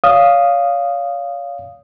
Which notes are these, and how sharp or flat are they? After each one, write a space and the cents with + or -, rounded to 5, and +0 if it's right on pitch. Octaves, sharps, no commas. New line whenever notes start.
C#5 +35 F5 +0 D#6 -5